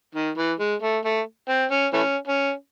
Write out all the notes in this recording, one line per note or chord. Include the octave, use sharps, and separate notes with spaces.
D#3
E3
G#3
A3
A3
C4
C#4
E3 A3 C#4
C#4